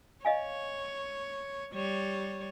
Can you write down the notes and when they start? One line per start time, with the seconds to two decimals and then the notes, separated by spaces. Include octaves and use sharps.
0.25 C#5 D#5 F5 G#5
1.74 G3 C#5